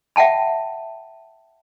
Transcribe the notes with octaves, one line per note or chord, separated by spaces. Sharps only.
E5 F#5 G5 A5 B5